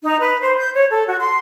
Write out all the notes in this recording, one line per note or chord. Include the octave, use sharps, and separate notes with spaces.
D#4
B4
C5
G6
C#5
A4
F#4
C6